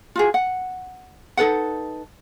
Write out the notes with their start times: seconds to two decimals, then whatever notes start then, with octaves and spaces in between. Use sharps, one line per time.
0.16 F4 F#4 G#4
0.34 F#5
1.37 D#4 A4 B4 F#5